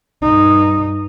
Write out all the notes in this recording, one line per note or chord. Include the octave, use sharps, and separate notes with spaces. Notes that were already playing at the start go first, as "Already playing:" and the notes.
G2 D#4